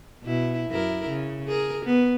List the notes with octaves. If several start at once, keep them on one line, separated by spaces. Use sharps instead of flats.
B2 E4
F#2 E4 A#4
C#3
G#4 A#4
B3